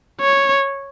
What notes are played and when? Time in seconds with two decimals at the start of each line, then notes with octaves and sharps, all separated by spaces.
0.21 C#5